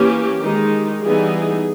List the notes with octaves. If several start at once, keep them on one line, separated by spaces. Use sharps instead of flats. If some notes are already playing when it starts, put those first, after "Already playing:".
Already playing: E3 A#3 C#4 G4
D#3 G#3 D#4
E3 G3 B3 D#4 G#4